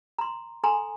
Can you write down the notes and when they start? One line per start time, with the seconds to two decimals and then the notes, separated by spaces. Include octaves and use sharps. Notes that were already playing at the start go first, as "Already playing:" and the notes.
0.18 A#5 C6
0.64 A4 G#5 A#5 C6